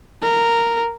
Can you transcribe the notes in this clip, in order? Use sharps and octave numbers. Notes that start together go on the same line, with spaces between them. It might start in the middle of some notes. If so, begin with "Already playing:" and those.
A#4